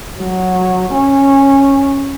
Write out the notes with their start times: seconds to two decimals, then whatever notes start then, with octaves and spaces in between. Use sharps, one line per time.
0.19 F#3
0.94 C#4